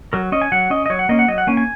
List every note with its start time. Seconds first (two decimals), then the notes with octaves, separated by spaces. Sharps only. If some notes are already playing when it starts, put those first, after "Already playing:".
0.13 F#3 A#4
0.32 C#4 D#5
0.41 G#5
0.52 F#3 F#5
0.70 C#4 D#5
0.86 D#5
0.90 F#3 C#5
0.99 F#5
1.09 A#3 C#4 D#5
1.19 F#5
1.28 F#3 D#5
1.38 F#5
1.47 A#3 C#4 G#5
1.57 G#5